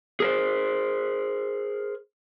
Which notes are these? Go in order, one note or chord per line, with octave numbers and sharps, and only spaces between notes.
G#4 A#4 C5